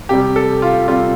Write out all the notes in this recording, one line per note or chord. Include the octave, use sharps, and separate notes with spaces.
C3 G3 G4
A4
F4
C3 G3 F4